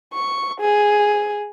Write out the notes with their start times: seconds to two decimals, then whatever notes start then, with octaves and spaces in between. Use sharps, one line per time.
0.13 C#6
0.61 G#4